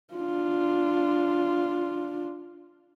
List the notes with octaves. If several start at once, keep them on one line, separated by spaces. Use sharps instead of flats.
D4 F4